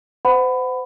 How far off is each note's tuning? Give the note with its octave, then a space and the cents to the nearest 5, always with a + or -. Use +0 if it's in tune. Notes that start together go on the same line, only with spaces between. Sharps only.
C5 -35 F#5 +0 B5 +20